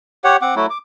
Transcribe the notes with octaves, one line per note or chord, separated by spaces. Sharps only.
G4 C#5 F#5
C4 F#5 D6
F#3 A3 E4 F#4
D6